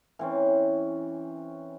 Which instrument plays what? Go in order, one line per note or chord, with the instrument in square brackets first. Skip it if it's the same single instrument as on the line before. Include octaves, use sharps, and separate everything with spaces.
[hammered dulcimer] E3 C4 C#4